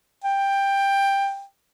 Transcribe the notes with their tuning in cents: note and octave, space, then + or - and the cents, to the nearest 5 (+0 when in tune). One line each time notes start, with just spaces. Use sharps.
G5 +10